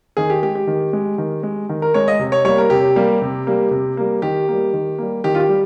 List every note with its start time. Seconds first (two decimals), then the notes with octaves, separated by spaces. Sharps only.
0.17 D#3 G#4
0.30 G4
0.43 G#3 G4
0.55 G4
0.67 D#3
0.93 G#3
1.18 D#3
1.43 G#3
1.69 D#3
1.82 A#4
1.94 G#3 C#5
2.08 D#5
2.19 C3
2.32 C#5
2.45 G3 A#3 C#5
2.58 A#4
2.70 C3 G4
2.96 G3 A#3
3.22 C3
3.47 G3 A#3
3.71 C3
3.97 G3 A#3
4.22 D#3 G4
4.48 G3 A#3
4.73 D#3
4.98 G3 A#3
5.24 D#3 G4
5.35 F4
5.40 G4
5.49 G3